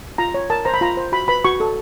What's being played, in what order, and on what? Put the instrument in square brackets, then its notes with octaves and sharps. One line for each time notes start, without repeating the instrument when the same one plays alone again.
[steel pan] F4 A#5
C#5
A#4 A5
C5 A#5
B5
F4 A#5
C5
F#4 B5
B4 B5
F#4 C#6
A4